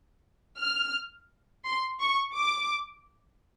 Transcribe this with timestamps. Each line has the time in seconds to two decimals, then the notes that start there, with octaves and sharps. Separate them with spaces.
0.58 F6
1.65 C6
2.01 C#6
2.36 D6